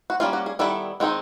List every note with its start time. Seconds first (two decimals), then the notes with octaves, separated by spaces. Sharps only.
0.10 F#4
0.20 G3 A#3 C#4 F4
0.33 F#4
0.46 G#4
0.59 D#3 G3 B3 E4 A4
1.00 D#3 G#3 C4 D#4